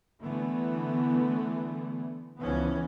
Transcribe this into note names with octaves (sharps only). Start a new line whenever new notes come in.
D3 E3 A3 B3
C#2 E3 F3 B3 C#4